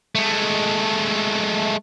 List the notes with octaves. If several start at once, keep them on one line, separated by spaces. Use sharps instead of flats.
G#3 A3